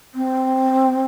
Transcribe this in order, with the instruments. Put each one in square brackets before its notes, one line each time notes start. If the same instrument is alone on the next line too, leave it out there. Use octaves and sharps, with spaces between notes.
[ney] C4